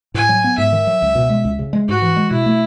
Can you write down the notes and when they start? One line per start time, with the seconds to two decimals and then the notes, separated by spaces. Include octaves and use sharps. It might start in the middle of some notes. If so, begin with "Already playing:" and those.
0.14 A2 G#5
0.29 F#3
0.44 B3
0.58 G#2 E5
0.72 D#3
0.87 F#3
1.02 C#2
1.15 B2
1.30 G#3
1.45 C#2
1.59 C#3
1.73 G#3
1.89 G#2 F#4
2.02 E3
2.16 G#3
2.31 B2 E4
2.46 A3